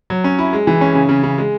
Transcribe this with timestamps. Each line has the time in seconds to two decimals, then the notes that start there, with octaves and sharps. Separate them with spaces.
0.10 F#3
0.24 C#4
0.39 E4
0.53 G#3
0.67 E3
0.81 C#4
0.95 C#3
1.09 C#3
1.23 C#3
1.38 G#3